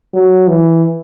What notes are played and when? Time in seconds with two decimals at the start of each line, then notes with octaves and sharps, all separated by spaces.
0.14 F#3
0.48 E3